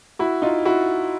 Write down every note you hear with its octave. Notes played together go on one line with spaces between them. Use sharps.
E4 F#4
D#4 F4
E4 F#4